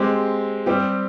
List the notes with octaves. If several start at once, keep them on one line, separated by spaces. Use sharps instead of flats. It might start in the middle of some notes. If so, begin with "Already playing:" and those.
Already playing: G#3 C4 G4
G3 C4 G4